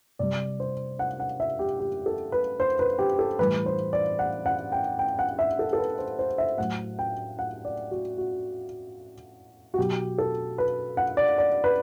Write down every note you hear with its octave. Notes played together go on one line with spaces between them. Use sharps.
C3 G3 D5
C5
F#5
F#5
E5
G4
G4
A4
B4
C5
B4
G4
A4
A2 E3 G3 B4
C5
D5
F#5
F#5
G5
G5
F#5
E5
A4
A4
B4
C5
C5
E5
A2 F#3 F#5
G5
F#5
D5
F#4
F#4
F#4
B2 F#3 G4
A4
B4
F#5
D5
D5
B4